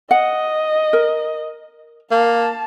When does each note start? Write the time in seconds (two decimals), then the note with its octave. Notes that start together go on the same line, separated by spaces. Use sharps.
0.11 D#5 F#5
0.93 A#4
2.11 A#3 A5